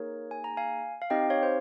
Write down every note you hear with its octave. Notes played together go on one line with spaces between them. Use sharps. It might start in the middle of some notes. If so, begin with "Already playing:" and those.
Already playing: A#3 D#4 G#4 A#4 C#5
G#5
A#5
F5 G#5
F5
C4 D#4 G4 D#5 G5
C#5 F5
C5